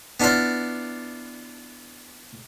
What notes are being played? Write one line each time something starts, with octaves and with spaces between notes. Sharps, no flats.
B3 D4 E4 F4 D5